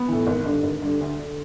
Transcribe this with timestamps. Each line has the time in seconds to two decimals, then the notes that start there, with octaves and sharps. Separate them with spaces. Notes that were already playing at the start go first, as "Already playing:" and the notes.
Already playing: B3
0.08 A2 E3
0.27 G#1
0.46 G2 D3
0.63 G#1
0.82 G2 D3
1.01 D2
1.19 D3